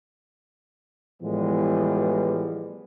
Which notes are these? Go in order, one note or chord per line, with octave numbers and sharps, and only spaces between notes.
A2 E3 F3 G3 G#3 B3